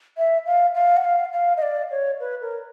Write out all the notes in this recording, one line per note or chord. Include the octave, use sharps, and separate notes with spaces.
E5
F5
F5
F#5
F5
F5
D#5
D5
C#5
B4
A#4